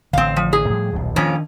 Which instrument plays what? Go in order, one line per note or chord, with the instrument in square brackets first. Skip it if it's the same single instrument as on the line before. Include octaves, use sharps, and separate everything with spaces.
[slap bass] A1 D3 [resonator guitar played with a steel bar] C4 F5
[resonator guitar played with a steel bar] F3
G#4
[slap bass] A2 F3 G3
D#1 B1 B2
[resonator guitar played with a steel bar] F2 A#2 C#4 [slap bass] D#3 D4